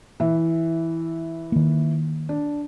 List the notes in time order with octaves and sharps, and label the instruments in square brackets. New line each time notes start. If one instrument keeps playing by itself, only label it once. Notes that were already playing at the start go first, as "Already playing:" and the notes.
[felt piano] E3 E5
[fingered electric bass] D#3 A#3
[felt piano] D4